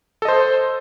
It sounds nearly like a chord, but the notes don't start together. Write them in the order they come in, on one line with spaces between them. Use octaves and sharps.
A4 D#5 C5